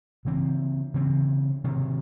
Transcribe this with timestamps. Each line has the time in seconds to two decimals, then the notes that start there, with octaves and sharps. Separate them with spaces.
0.25 C#3 E3 C4
0.94 C#3 E3 C4
1.64 C3 D#3 F#3